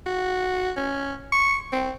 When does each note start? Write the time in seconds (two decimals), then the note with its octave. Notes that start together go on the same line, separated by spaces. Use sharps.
0.06 F#4
0.76 C#4
1.32 C#6
1.72 C4